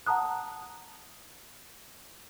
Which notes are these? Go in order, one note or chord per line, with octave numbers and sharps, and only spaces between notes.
F#5 A5 A#5 D#6 F#6